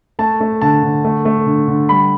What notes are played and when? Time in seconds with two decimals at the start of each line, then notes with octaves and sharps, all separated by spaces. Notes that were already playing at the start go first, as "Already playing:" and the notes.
0.19 A3 A5
0.40 A3
0.62 D3 A5
0.83 D3
1.05 A3
1.25 A3
1.47 D3
1.68 D3
1.89 G3 B5